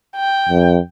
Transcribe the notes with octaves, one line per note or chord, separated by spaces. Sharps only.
G5
F2